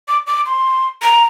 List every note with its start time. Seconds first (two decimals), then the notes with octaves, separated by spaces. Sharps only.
0.08 D6
0.27 D6
0.46 C6
1.02 A#5